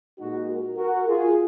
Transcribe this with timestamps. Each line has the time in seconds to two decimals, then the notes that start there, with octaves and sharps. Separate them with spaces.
0.19 A#2 G#3 D#4 F#4
0.48 F#4 A#4
0.77 F#4 A#4
1.08 F4 G#4